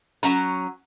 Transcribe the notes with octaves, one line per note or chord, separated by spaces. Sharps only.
F#3 C#4 A#5